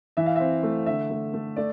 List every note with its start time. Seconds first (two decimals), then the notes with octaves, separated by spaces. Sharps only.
0.17 E3 E5
0.26 F5
0.36 C4 E5
0.63 A3
0.86 D3 E5
1.10 A3
1.34 A3
1.56 A3 D5